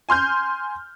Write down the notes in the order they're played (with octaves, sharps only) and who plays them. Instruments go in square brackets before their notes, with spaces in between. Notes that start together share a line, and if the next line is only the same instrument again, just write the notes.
[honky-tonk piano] G#5 C6 F6 G6